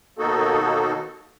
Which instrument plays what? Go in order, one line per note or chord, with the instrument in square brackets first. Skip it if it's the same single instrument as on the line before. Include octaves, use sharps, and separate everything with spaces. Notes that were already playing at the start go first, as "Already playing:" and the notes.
[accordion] D#2 B2 A#3 D#4 F#4 A4